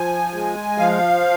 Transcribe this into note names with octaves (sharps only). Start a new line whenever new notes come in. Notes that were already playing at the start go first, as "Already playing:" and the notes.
Already playing: F3 G#5
G#3
F3 F5